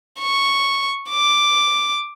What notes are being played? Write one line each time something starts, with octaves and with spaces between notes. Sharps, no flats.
C#6
D6